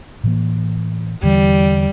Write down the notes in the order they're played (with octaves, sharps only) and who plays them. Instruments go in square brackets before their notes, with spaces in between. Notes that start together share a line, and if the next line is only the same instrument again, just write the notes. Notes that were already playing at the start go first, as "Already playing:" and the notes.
[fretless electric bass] A2 E3 A#3
[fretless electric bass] E2 D3 E3 [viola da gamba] G3